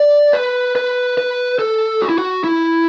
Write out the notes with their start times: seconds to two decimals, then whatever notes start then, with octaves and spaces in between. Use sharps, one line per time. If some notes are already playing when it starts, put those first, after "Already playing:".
Already playing: D5
0.33 B4
0.76 B4
1.18 B4
1.59 A4
2.02 F#4
2.09 E4
2.18 F#4
2.44 E4